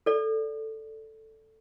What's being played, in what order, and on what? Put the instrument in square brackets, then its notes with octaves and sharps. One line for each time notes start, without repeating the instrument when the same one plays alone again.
[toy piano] A4 D5